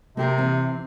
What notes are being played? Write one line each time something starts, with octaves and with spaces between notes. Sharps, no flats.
C3 A#3 G4 A#4
E3 C4